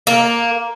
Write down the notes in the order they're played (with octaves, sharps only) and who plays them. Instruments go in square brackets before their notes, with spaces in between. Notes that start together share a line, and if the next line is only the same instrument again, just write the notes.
[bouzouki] A#3